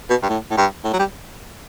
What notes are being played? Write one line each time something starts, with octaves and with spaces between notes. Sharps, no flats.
B2
G2
A2
A2
G2
A2
F#3
G3